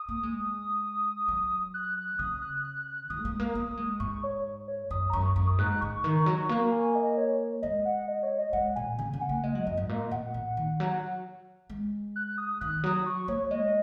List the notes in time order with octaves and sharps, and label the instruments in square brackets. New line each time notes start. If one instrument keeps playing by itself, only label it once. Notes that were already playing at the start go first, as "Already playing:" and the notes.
Already playing: [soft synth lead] D#6
[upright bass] A#3
G#3
F#3
[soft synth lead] F#6
F#6
[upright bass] C#3 [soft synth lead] D#6
[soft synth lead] F#6
F#6
F#6
[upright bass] D#3 [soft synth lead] D#6
[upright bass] A#3
G#3
A#3
A#3
G#3
[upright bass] G#2 [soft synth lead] C#6
[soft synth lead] C#5
C#5
[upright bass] F#2 [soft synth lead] D#6
[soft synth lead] A#5
[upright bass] F#2 [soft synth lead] C#6
[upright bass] F#2 [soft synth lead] C#6
[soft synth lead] D#6
[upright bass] G#2 [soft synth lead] F#6
[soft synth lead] F#6
[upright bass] C#3 [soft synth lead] C#6
[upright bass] D#3
F#3
A#3
[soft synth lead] G#5
D#5
C#5
[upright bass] G#3 [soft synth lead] D#5
[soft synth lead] F#5
D#5
C#5
D#5
[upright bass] G#3 [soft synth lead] F#5
[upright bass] A#2 [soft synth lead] G#5
[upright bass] C#3 [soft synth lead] G#5
[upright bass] C#3
[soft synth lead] F#5
[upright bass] A#3
[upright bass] G#3 [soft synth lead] D#5
[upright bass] F#3
[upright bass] F#2 [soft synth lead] D#5
[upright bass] G#2
[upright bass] A#2 [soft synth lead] D#5
[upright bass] A#2 [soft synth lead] F#5
[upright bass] A#2
D#3
F#3
G#3
[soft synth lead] F#6
D#6
[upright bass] D#3 [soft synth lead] F#6
[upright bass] F#3 [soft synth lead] D#6
[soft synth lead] C#6
[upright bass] A#3 [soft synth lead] C#5
[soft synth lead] C#5
[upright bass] G#3 [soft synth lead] D#5